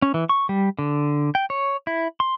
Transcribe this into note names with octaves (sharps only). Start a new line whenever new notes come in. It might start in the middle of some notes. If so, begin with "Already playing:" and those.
C#4
E3
C#6
G3
D3
G5
C#5
E4
C6